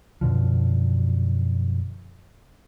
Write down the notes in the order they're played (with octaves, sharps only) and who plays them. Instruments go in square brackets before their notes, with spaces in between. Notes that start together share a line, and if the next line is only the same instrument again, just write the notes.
[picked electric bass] F#2 B2 D3 F3